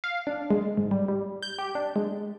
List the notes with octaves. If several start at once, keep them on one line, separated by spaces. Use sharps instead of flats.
F5
D4
G#3
G#2
G3
G3
G6
G4
D4
G#3